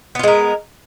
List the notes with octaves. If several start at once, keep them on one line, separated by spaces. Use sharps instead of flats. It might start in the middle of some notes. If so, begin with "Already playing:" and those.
G#3 B3 F4 A#4